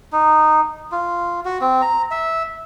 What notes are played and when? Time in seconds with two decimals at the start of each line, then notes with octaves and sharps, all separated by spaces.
0.12 D#4
0.92 F4
1.45 F#4
1.61 C4
1.82 A#5
2.11 E5